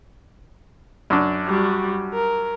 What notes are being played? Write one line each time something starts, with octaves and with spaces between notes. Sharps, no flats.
F#2 D4
G3 F#4
A#4